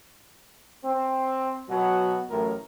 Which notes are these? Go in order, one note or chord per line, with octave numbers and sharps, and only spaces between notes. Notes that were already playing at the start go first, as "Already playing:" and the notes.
C4
B2 F#3 B3 F#4
A1 F#2 A2 A#4